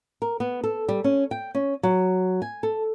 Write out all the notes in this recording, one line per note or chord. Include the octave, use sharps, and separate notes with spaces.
A#4
B3
A4
G3
C#4
G5
C#4
F#3
G#5
A4